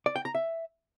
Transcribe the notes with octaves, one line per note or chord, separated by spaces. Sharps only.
D5
G5
A#5
E5